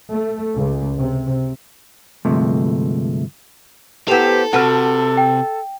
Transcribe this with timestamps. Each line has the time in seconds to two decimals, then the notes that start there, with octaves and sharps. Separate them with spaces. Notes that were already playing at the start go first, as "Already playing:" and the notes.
0.12 A3
0.55 C#2
0.99 C3
2.25 D2 G2 C3 F3 G#3 A3
4.08 B3 C4 E4 G4 A4 E7 F7
4.53 C3 F#4 A4 B4 A5 F6
5.17 G5